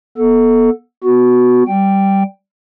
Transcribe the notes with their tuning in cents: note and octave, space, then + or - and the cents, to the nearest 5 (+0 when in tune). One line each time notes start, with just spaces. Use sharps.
B3 -30 A4 +0
B3 +10 F#4 +0
G3 -10 G5 +0